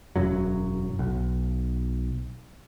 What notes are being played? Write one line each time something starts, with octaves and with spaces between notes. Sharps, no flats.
E1 F#2 F#3
B1